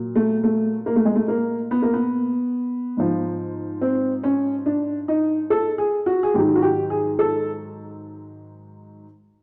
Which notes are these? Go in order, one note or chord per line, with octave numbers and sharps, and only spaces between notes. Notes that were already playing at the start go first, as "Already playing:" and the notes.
Already playing: A#2 F#3
A3
A3
A#3
A3
G#3
A3
A#3
B3
A#3
B3
G#2 F3
C4
C#4
D4
D#4
A4
G#4
F#4
G#4
G#2 D#3 F#3 G4
F#4
G4
G#4
A4